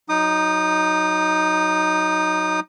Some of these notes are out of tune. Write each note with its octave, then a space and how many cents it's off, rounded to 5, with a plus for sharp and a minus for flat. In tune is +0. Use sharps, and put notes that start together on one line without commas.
F#3 +0 D#4 +10 D#6 -30